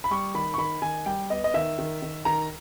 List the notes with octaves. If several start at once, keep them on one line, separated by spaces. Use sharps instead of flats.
B5
G3 C#6
D#3 B5
C#6
D#3 B5
D#3 G#5
G3 G5
B3 D#5
D#5
D#3 E5
D#3
D#3
D#3 A#5